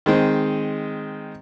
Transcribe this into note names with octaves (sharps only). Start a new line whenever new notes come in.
D#3 G#3 C4